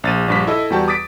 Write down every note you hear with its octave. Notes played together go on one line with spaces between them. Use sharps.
A#1 A6 D#7
A#1 G2 B6
E4 A4 D#5
E2 G3 F#4 G5 A5
D6 D#6 A6 B6 D7